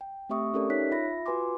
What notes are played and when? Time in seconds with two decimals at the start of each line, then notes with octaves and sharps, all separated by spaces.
0.01 G5
0.29 A3 C4 G4 E5 C#6 D#6
0.54 C#4 G4 A4 A#4 D5
0.70 D#4 C#5 E5 F#6 B6
0.91 F4 E5 B5 A#6
1.26 F4 F#4 B4 G#5 C6 D6